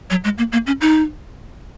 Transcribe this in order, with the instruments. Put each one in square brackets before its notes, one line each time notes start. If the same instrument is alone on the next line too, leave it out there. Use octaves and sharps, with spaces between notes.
[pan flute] F#3
G#3
A#3
A#3
C#4
D#4